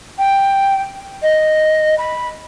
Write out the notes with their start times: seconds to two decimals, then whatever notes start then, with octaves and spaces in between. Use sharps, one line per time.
0.18 G5
1.22 D#5
1.98 B5